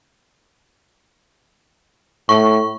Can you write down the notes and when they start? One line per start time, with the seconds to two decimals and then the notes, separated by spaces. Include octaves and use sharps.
2.29 A2 C#6